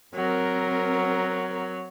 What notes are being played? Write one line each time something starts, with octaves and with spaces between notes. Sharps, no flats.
F#3 C4 A#4